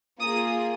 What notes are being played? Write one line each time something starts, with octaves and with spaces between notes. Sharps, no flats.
A#3 F4 G#4 D#6